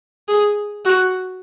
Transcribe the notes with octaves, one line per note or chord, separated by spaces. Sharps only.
G#4
F#4